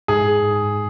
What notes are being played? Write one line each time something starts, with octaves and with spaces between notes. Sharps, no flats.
G#2 G#4